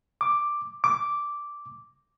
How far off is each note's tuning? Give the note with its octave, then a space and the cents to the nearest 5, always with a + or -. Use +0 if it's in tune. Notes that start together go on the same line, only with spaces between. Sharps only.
D6 +5
D6 -5